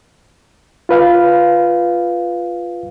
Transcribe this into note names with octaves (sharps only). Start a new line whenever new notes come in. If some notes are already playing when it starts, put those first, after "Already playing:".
F4 B4 F5